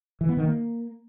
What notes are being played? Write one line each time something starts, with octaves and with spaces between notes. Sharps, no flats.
E3
B3
D#3
A#3